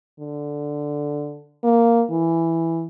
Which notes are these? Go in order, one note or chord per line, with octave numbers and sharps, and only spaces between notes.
D3
A#3
E3